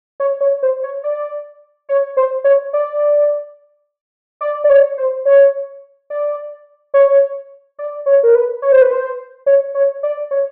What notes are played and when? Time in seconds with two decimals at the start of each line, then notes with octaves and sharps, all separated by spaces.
0.20 C#5
0.41 C#5
0.63 C5
0.83 C#5
1.04 D5
1.89 C#5
2.17 C5
2.44 C#5
2.73 D5
4.41 D5
4.64 D5
4.70 C#5
4.98 C5
5.25 C#5
6.10 D5
6.94 C#5
7.79 D5
8.06 C#5
8.23 A#4
8.35 B4
8.62 C#5
8.72 C5
8.82 B4
8.91 C5
9.46 C#5
9.75 C#5
10.03 D5
10.31 C#5